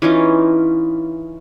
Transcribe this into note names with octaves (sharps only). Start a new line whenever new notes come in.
E3 C#4 D#4 F4